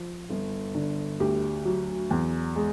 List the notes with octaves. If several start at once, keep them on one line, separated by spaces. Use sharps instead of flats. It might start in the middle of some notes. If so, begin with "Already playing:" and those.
Already playing: F3
G1
D3
D2 G4
F#3
E2
G#3